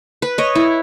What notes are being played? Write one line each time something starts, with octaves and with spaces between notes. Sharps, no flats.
B4
C#5 D#5
E4